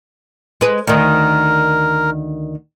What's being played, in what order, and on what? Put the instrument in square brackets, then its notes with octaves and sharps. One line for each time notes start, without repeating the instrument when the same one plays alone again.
[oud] G#3 B4
[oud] D2 D#3 [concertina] A#4